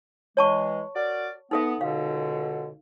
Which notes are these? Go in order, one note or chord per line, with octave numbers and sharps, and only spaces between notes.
E3 G#3 C#5 A5 C#6
F#4 A#4 D5
B3 D#4 A4 E5
C#2 B2 D3 F5